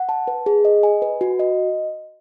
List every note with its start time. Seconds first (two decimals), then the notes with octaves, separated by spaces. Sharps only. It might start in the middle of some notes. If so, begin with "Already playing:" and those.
Already playing: F#5
0.09 A5
0.28 B4
0.46 G#4
0.65 D#5
0.83 G#5
1.02 B4
1.21 F#4
1.39 D#5